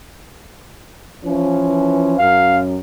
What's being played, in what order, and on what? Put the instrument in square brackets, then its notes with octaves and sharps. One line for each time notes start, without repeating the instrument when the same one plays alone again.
[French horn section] E3 F3 C#4
[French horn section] F#2 [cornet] F5